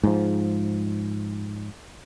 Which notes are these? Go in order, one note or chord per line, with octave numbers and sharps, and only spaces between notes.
G#2 F3